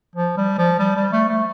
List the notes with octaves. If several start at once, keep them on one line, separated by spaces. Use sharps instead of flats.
F3
G3
F3
G3
G3
A3
A3